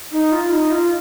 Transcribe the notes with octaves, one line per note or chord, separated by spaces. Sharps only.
D#4
F4
D#4
F4